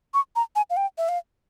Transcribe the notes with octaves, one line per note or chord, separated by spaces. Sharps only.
C#6
A#5
G#5
F5
G5
E5
F5